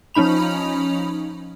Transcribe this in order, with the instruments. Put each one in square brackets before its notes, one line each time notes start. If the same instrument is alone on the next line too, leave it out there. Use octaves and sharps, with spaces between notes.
[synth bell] F3 C#4 D#4 B5 F7